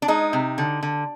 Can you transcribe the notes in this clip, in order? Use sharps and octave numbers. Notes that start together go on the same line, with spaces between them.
D4
G#3 D#4
C3
D3
D3